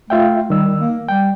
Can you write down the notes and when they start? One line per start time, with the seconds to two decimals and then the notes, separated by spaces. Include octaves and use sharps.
0.10 A3 F4 E5 G5
0.50 D#3 G3 E6
0.80 A#3
1.08 G3 G5